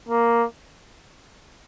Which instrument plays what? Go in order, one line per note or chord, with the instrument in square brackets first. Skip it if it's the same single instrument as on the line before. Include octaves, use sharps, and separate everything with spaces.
[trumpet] A#3